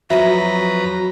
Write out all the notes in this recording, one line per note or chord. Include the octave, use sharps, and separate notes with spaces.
F2 F#3 F#4 B4 D#5 E5 A#5